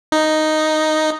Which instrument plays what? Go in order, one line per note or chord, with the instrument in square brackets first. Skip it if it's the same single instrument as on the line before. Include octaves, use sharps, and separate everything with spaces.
[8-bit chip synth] D#4